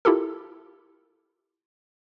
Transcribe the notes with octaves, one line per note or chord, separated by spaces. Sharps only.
E4 F4 G4 A4 A#4